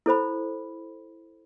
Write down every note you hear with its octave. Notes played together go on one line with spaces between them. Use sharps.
E4 A4 C5 B5